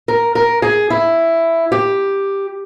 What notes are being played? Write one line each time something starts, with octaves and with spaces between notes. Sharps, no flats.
A#4
A#4
G#4
E4
G4